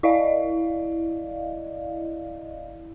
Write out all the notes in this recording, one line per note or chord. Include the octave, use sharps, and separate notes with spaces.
E4 D5 D#5 F5